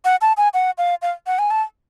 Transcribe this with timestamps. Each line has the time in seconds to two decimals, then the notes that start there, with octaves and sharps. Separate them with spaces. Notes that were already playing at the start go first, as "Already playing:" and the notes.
0.05 F#5
0.21 A5
0.37 G#5
0.54 F#5
0.78 F5
1.02 F5
1.27 F#5
1.39 G#5
1.51 A5